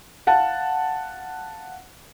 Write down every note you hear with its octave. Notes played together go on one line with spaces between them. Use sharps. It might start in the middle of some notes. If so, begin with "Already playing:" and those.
F5 F#5 A5